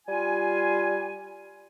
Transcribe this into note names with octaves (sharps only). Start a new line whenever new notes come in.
G3 F4 G#5